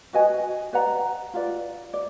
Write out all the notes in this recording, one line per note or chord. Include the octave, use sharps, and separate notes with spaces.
F#4 B4 D#5 G#5
B4 D5 F#5 A#5
F4 B4 D5
D5